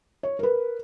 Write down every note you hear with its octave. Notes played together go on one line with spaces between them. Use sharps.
C#5
A#4 B4